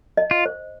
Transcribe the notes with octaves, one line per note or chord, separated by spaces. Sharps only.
D#5
F4
C5